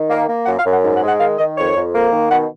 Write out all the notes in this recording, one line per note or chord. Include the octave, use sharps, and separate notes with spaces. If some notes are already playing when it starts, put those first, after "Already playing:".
Already playing: D#3
A#3
A#3
F#2 F#5
F5
F#2
F#5
G#2
F#5
G#3
F#5
D#3 F5
D#3 D#5
F2 C#5
F2
A#3
D#3
B2 F#5